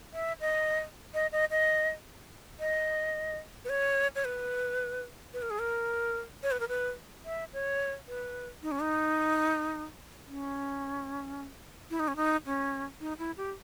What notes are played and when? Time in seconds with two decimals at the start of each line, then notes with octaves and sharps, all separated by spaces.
0.14 E5
0.41 D#5
1.14 D#5
1.32 D#5
1.51 D#5
2.60 D#5
3.65 B4
3.69 C#5
4.15 C#5
4.25 B4
5.34 B4
5.42 A#4
5.50 G#4
5.59 A#4
6.43 C#5
6.51 B4
6.60 A#4
6.68 B4
7.25 E5
7.53 C#5
8.08 B4
8.62 D#4
8.71 C#4
8.80 D#4
10.27 C#4
11.90 E4
12.00 D#4
12.08 C#4
12.16 D#4
12.46 C#4
13.00 D#4
13.19 E4
13.37 G4